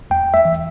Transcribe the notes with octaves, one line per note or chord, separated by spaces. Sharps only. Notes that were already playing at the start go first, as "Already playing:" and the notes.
E2 G5
E5
E3